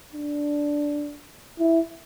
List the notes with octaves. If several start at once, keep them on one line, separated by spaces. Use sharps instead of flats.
D4
E4